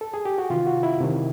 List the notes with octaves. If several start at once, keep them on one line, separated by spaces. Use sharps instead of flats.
A4
G#4
G4
F#4
C3 D#3 F4
F#4
E4
C3 D#3